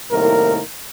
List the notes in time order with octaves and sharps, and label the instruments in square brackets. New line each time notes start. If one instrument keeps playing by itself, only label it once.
[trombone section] C2 A2 D#3 A#3 A#4